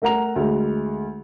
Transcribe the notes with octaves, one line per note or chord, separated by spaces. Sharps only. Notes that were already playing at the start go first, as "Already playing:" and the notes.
A3 A#4 F#5 A#5 F7
D2 G#3